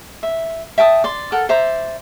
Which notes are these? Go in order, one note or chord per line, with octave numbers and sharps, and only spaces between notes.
E5
E5 G5 A5 D#6
D5 C6
A4 A#4 F#5
C5 D5 E5 A#5